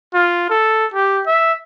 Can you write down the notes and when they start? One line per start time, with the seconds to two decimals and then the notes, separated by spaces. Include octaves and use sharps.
0.14 F4
0.50 A4
0.94 G4
1.27 E5